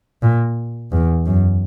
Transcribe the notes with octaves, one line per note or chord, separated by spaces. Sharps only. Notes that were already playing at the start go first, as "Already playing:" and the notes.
A#2
E2
F#2